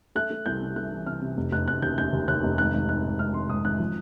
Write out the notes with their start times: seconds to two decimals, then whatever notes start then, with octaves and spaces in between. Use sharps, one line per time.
0.15 A3 F#6
0.30 A3
0.46 C2 G6
0.61 C3
0.76 A3 F#6
0.92 E3
1.06 C3 F6
1.22 C3
1.37 F1
1.52 F1 F#6
1.67 F1 F#6
1.82 D#2 G6
1.98 F1 G6
2.13 D#2
2.28 D#2 F#6
2.43 F1
2.58 G#1 F#6
2.73 G#1
2.89 G#1 F#6
3.04 G#2
3.19 G#2 F6
3.34 G#1 C6
3.50 G#2 D#6
3.64 G#1 F#6
3.80 F3